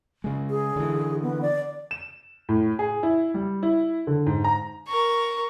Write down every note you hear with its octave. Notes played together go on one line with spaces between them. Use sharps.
C#3 G#3
G#4
D3 E3
B3
D5
E7
A2
G#4
E4
G3
E4
D3
G#2
A#5
A#4 C#6